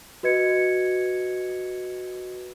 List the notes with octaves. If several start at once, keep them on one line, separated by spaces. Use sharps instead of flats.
F#4 B4 D#5 G#6 C#7